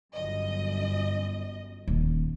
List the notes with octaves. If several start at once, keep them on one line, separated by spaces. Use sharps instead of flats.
G1 F#2 D#5
D#1